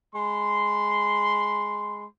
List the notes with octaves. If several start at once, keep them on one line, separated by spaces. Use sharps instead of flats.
G#3 B5 C6